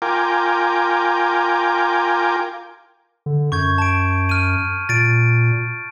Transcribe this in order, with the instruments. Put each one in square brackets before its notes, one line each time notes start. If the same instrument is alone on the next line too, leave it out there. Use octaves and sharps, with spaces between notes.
[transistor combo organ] F4 A#4 G5 G#5 D6
[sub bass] D3
[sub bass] F#2 [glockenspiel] C#6 G6 G#6
[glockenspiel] A5 D7
F6 D#7
[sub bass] A#2 [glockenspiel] A6 D7